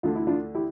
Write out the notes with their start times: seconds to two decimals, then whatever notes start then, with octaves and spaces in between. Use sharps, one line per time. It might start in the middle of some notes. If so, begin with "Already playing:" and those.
0.03 D2 D3 A3 F4
0.15 E4
0.27 D4 F4
0.55 E4 G4